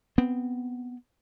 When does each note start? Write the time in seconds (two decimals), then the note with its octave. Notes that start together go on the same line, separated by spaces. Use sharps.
0.18 B3 C4